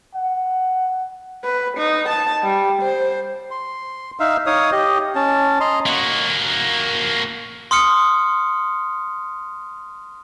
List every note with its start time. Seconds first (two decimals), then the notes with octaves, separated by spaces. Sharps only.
0.14 F#5
1.45 B4
1.77 D#4
2.09 A5
2.43 G3
2.82 C5
3.51 C6
4.20 D#4 E5 F5
4.46 D#4 C#5 F5 D#6
4.72 G4 D#5
5.15 C#4 A5
5.60 D#5 A#5 C6
5.86 A#3 F#4
7.71 C6 D#6 F6 C#7